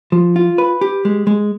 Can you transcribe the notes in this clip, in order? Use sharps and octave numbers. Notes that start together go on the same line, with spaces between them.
F3
F4
B4
G4
G#3
G#3